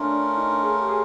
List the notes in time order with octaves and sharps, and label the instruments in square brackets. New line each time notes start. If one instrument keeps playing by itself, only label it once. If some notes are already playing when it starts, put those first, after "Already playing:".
Already playing: [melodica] A3 C#4 F4 A#4 [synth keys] D4
[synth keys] D4
D#4
G#4
G4
G#4